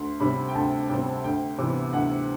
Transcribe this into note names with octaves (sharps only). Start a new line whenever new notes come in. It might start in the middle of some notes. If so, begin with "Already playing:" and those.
Already playing: D2 C6
C3 G3 C4 B5
G5
D2 A5
C3 G3 C4 G5
D2 G5
C3 E3 B3
D2 F#5